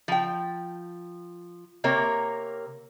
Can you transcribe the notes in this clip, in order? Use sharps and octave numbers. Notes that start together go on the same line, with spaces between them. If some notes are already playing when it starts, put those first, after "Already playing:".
F3 G5
C3 A#3 A#4 C#5